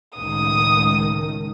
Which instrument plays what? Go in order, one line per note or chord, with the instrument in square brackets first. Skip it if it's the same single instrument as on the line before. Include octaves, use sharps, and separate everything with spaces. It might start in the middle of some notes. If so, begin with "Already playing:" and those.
[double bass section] C#2 A2 D#3 [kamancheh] D#6